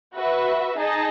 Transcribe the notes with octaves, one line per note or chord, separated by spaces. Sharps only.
F#4 B4 E5
D#4 G#4 D#5 A5